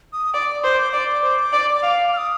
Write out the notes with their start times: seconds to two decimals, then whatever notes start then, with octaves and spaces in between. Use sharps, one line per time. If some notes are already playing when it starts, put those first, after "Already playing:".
0.13 D#6
0.34 D5 D6
0.48 D6
0.63 C5 C6
0.78 D6
0.93 D5 D6
1.23 C5
1.53 D5
1.83 F5
2.13 F6
2.18 D#6